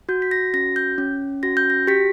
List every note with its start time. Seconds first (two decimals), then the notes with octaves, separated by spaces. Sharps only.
0.09 F#4 G6
0.22 B6
0.31 A#6
0.54 C#4 A#6
0.76 G6
0.98 C#4
1.43 F#4 A#6
1.57 G6
1.70 A#6
1.87 G4 B6